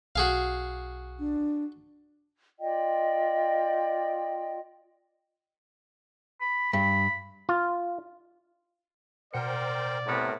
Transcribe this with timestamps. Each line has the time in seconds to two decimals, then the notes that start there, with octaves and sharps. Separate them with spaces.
0.16 B1 F#4 G#4 F5
1.19 D4
2.60 F4 D5 D#5 G5
6.41 B5
6.73 G2 B5
7.49 F4
9.34 B2 A#4 C5 D5 F#5 G5 C#7
10.07 A2 C3 B3 A#4